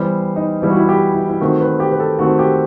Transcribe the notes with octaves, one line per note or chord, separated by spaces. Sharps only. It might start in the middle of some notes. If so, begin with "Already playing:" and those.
Already playing: E3 G3 B3 C5
D#4
E3 G3 B3 E4
F#4
E4
G4
E4
E4
D#3 A3 C4 F#4
B4
G4
B4
A4
D#3 A3 C4 F#4
G4